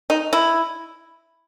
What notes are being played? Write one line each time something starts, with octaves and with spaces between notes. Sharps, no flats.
D#4
E4